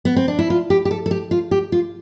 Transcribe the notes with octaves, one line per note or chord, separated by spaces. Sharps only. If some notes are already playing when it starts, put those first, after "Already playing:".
B3
C4
D4
E4
F4
G4
G4
A4
A4
G4
F4
G4
F4